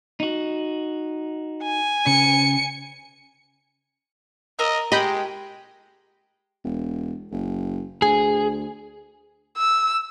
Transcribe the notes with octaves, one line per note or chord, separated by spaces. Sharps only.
D#4 F#4
G#5
C#3 C#7
A#4 D#5 E6
G#3 G4 D#5 B5 G6
E1
F#1
D2 G#4
E6